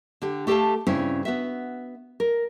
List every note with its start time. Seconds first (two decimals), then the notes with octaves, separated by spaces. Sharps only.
0.22 D3 G4
0.47 A3 G4 A4 E5 F5 A5
0.87 G2 C#3 C4 C#4 E4
1.25 B3 F#4 E5
2.20 A#4